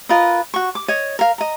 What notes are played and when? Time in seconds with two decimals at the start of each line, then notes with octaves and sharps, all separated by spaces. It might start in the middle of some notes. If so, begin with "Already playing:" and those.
0.09 F4 A#4 B4 D#5
0.54 F#4 C#6
0.75 D6
0.88 C#5 D#5
1.19 A#4 F5
1.38 D#5 A#5